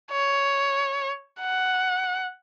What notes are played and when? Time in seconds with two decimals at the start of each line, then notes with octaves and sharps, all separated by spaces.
0.11 C#5
1.40 F#5